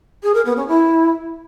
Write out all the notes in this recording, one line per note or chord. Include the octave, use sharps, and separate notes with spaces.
G#4
A#4
B3
C#4
E4